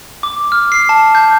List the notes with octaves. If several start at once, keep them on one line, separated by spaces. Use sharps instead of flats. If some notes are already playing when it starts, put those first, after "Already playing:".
D6
F6
C7
A5
G6